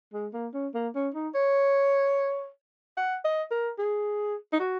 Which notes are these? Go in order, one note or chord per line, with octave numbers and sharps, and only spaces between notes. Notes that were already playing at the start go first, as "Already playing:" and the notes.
G#3
A#3
C#4
A#3
C#4
D#4
C#5
F#5
D#5
A#4
G#4
D#4
F#4